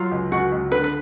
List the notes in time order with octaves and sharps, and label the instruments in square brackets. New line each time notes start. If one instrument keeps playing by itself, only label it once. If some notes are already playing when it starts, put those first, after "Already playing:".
Already playing: [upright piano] F#3 [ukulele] F4
[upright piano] C#2
[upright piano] C#2 [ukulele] F#4
[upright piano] C#2
[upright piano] D3 [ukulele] B4
[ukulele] B4